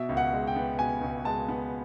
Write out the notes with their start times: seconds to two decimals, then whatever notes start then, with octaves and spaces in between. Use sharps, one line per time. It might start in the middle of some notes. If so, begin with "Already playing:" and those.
Already playing: B2 E5
0.09 C#2
0.17 F#5
0.33 G#3
0.47 G5
0.56 B3
0.79 B2 G#5
1.01 C#2
1.25 G#3 A5
1.49 B3